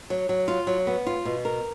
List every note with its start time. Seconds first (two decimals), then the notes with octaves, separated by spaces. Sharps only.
0.10 F#3
0.29 F#3
0.48 F4
0.67 F#3
0.87 B3
1.07 F4
1.25 B2
1.45 A#4